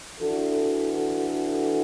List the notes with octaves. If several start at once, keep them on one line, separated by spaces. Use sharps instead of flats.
E3 D4 F#4 A4